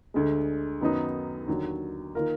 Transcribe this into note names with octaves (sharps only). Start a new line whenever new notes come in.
D2 D3 G#3
F#2 D#3 F#3 B3 D#4
D#2 D3 F#3
D#3 A#3 F4 A#4